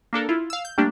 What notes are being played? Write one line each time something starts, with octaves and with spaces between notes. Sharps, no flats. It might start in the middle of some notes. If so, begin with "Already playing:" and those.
A#3 D4 A4 A#4
E4 F4
F5 E6
G6
G3 A3 A#3 D4 G4